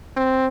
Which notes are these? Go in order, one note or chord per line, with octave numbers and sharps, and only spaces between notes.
C4